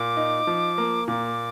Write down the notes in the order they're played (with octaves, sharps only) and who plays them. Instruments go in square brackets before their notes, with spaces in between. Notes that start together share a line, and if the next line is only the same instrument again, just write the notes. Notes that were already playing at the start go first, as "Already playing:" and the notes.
Already playing: [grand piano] A#2 [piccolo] D6
[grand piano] D#4
F3
A#3
[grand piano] A#2 [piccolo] D6